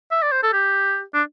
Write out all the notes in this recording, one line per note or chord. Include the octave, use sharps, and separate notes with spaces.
E5
D5
C5
A4
G4
D4